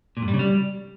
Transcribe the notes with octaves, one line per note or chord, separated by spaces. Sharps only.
A#2
G2
G3
C#3
G3